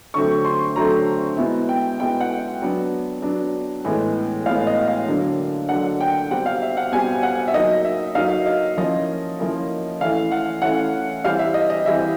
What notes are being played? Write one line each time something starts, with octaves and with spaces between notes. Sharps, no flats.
D3 F#3 A3 C4 C#6
C6
D3 F#3 A3 C4 A#5
B2 G#3 B3 E4
G5
B2 G#3 B3 E4 G5
F#5
F#3 B3 D4
F#3 B3 D4
A2 E3 G#3 B3
A2 E3 G#3 B3 F5
D#5
F5
D3 F#3 A#3 D4
D3 F#3 A#3 D4 F#5
G5
B2 G3 C4 F#5
F5
E5
F#5
B2 G3 C4 G#5
F#5
E5
F#3 A#3 D#4 D#5
E5
F#3 A#3 D#4 F5
D#5
F3 A#3 C#4 E4 D#5
F3 A#3 C#4 E4
E3 A3 C#4 E4 F5
F#5
E3 A3 C#4 E4 F#5
E3 G3 C4 F5
E5
D#5
D#5
E3 G3 C4 E5